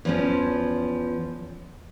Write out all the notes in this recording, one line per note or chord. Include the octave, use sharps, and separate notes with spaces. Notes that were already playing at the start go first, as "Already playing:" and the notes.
E2 F3 C#4